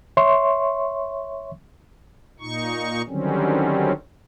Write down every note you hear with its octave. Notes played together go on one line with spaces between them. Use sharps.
C#5 E5 C6 C#6
A#2 D#4 C#6
D3 D#3 F#3 G3 C4 C#4